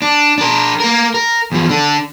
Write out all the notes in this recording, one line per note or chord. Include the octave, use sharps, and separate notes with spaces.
D4
D4 A#4
A#3 A#4
A#4
E2 F3
D3 D4